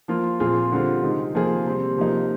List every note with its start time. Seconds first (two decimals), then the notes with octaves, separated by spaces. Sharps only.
0.08 F3 A#3 F4
0.40 A#2 F3 C4 F4 G#4
0.72 D3 G3 C4 F4
1.03 C3 D#3 G#3
1.34 C3 F3 A#3 F4 G#4
1.65 C3 G3 C4
1.97 C3 F3 A#3 D#4